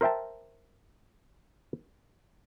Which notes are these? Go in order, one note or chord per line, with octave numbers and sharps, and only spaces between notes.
A#4 C5 E5 G5 A5